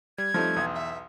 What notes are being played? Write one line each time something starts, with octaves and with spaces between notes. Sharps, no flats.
G3 G#6
F3 G3 A3 C4 D#4
B1 E2
E5